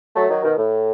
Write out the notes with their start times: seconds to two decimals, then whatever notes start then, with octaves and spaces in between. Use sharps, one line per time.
0.15 F#3 A3
0.30 D#3 F#3
0.44 B2 D#3
0.58 A2